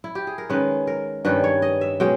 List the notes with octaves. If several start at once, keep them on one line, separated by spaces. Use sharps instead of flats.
E4
G4
G#4
A#4
D#3 G#3 C#4 B4
A#4
G2 D#3 G3 C#4 B4
C#5
D#5
E5
B2 G#3 C#4 G5